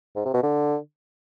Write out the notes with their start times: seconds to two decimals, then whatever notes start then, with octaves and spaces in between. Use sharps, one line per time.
0.16 G#2
0.25 C3
0.34 B2
0.43 D3